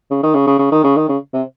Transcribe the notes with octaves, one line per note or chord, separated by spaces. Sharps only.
C#3
D#3
C#3
C#3
C#3
D#3
C#3
D#3
C#3
C3